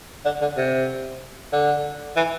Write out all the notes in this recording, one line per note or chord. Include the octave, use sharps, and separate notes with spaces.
D3
D3
C3
D3
E3